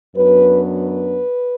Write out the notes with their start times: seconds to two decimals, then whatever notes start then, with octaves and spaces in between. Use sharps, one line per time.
0.16 F#2 F#3 B3 D4 B4
0.82 B4